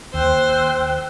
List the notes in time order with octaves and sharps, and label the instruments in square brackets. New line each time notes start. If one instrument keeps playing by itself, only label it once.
[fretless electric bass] D#2 [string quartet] C5 [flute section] G5 E6 F#6